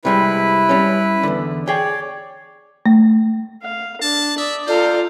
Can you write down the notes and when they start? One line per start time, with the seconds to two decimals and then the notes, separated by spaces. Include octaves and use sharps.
0.05 C3 G3 G#3 E4 B4
0.69 G3 C#4
1.23 E2 D3
1.68 G#4 C#5 D5 G5
2.86 A3
3.63 F5
4.01 D4 A5
4.38 D5 E5 D#6
4.67 F4 A4 C5 D5 F5 A#5